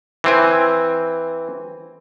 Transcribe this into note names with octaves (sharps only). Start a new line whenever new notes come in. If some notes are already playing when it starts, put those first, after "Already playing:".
E3 C4 G#5